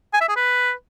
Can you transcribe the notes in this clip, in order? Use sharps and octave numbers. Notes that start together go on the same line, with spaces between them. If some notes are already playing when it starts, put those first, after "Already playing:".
G#5
E5
G#4
B4